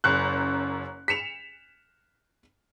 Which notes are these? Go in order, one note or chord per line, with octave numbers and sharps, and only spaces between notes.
F#1 F#2 F#6
B6 C#7 E7 F7